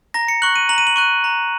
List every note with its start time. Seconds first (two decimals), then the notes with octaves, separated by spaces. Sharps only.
0.14 A#5 A#6
0.28 C#7
0.42 C#6 F#6 F#7
0.56 D#7
0.69 A#5 F#7
0.78 D#7
0.87 F#7
0.96 C#6 F#6 D#7
1.24 A#5